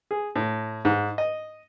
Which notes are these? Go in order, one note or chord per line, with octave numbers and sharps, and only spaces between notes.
G#4
A2
G#2
D#5